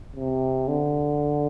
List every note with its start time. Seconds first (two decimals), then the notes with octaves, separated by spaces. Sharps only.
0.16 C3
0.68 D3